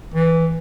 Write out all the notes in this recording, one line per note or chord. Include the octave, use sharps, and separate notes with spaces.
E3